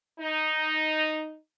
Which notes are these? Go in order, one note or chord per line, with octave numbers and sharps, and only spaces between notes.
D#4